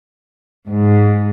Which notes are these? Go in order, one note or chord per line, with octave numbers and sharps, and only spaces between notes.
G#2